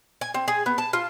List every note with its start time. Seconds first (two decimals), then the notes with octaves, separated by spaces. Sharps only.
0.21 G#5
0.34 C4
0.48 G#4
0.66 B3
0.78 A5
0.93 F4